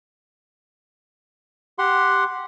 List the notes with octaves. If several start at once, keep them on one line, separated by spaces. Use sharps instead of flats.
G4 F#5 C6